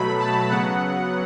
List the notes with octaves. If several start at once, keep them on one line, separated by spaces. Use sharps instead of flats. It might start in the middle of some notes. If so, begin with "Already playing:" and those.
Already playing: B2 F#3 A3 B5
A5
C#3 F#3 B3 F#5